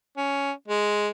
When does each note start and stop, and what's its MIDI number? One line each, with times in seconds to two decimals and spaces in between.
0.17 0.52 61
0.68 1.09 56